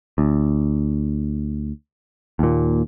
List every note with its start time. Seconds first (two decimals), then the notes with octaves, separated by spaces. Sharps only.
0.18 D2
2.39 D#2 A#2